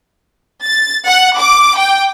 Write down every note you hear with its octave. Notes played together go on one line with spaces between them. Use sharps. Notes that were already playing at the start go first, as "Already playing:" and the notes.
A6
F#5
D6
G5